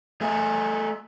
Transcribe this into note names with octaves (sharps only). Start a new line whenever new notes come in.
A3 G#4